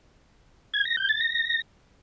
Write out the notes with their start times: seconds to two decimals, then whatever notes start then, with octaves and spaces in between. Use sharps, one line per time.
0.74 G#6
0.85 A#6
0.97 G6
1.09 A6
1.21 A#6